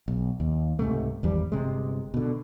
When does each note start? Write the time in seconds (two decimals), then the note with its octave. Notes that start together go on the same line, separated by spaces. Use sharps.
0.08 B1
0.40 D#2
0.79 C#2 G#2 C3 A3
1.23 G#1 E2 G3
1.52 G1 C3 G#3
2.14 B2 D3